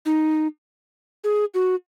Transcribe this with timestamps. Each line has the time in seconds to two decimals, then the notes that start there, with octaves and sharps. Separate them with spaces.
0.06 D#4
1.24 G#4
1.54 F#4